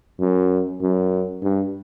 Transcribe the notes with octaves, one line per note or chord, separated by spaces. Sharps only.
F#2
F#2
G2